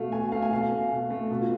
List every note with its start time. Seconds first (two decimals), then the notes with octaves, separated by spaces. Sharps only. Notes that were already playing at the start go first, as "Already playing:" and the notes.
Already playing: B2 A3 F5
0.12 B2 G#5
0.32 A3 F5
0.42 G#5
0.51 B2 F5
0.71 A3
0.91 B2
1.10 A3
1.30 B2
1.41 F4